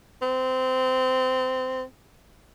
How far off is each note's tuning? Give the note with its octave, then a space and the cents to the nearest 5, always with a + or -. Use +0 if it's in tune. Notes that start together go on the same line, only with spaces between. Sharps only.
C4 -20